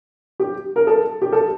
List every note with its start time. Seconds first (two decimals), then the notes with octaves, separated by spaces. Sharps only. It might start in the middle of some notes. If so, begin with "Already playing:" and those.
0.40 G4
0.76 A#4
0.87 A4
1.22 G4
1.32 A4